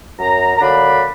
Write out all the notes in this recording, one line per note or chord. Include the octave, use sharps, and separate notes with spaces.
F#2 A#5
A#5
D3 F#3 A#3 D4 B5